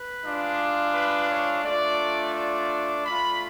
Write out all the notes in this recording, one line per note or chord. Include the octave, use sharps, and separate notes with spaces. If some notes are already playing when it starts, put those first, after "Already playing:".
Already playing: B4
G#3 D4 F4
B4
C#5
A3 D4 F4 D5
D5
A3 F4 B5